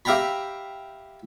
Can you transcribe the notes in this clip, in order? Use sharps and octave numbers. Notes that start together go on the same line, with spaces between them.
G4 E5 F5 G5 A#5 B5